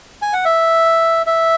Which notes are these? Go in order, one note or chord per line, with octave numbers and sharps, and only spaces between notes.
G#5
F#5
E5
E5